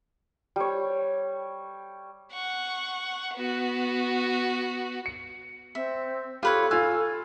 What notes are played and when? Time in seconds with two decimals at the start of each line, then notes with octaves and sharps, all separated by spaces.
0.56 G3 C#5
2.33 F#5 C#6
3.34 B3 F#4
5.06 C#7
5.75 C4 E5
6.43 F4 G4 A4 B4 C#5
6.71 F4 G#5 E6